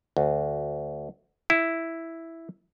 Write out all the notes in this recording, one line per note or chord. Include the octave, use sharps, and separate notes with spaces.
D2
E4